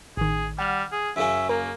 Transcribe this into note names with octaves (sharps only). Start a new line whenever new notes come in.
A1 D#3 G#4
G3 F#5 F6
G#4
F#2 C#3 C#4 E5
A#3 A#4